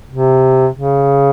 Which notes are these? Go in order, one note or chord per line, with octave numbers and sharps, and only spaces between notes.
C3
C#3